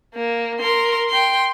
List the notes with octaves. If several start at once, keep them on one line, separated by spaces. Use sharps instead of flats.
A#3
A#4 C6
G5 C6